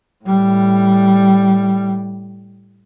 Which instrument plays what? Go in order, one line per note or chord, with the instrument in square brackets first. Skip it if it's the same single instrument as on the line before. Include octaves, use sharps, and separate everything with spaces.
[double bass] A2 G3